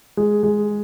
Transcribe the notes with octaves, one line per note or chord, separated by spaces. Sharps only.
G#3
G#3